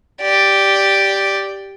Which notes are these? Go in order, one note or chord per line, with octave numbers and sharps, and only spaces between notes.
G4 D5